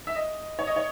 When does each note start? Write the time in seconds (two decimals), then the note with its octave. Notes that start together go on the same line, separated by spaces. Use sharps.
0.07 E5
0.15 D#5
0.59 C#5
0.67 D#5
0.76 C#5